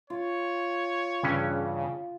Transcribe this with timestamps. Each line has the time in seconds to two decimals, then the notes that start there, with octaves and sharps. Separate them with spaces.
0.10 F4 C#5
1.23 G2 C#3 E3 C#4